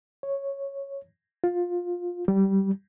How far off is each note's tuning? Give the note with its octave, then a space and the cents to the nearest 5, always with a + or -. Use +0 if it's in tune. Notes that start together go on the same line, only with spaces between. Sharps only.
C#5 -5
F4 +15
G3 -15